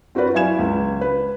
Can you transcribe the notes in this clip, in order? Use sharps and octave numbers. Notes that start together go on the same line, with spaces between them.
C4 F#4 A#4 B4 D5
F#3 E4 F5 G#5 G#6 E7
C#2
B4